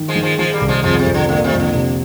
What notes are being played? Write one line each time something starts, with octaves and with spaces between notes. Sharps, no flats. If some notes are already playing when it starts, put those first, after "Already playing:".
Already playing: D#3
F3 G#3
D#3
F3 G#3
D#3 F3 G#3
G3 A#3
C2
F3 G#3
F2 F3 G#3
A#2
C3
F2
D3
D3 A#3
C3 D#3
F2
D3
C3